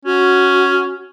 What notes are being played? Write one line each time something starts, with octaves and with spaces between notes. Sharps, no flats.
C#4 F#4